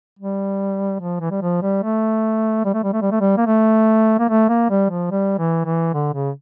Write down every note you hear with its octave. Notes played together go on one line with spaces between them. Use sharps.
G3
F3
E3
G3
F3
G3
A3
G3
A3
G3
A3
G3
A3
G3
A#3
A3
A#3
A3
A#3
G3
F3
G3
E3
E3
D3
C#3